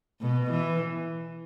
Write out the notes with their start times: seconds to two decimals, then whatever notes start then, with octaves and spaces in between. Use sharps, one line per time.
0.21 B2
0.50 E3